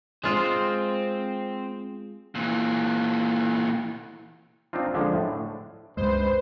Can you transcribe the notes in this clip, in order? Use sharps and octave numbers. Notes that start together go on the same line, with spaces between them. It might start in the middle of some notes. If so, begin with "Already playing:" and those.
G#3 C4 F4 C5
A#2 E3
C4 D4 D#4 F4
D3 F3 G#3 D4
A2
C#2 G2 G#3 B4 C5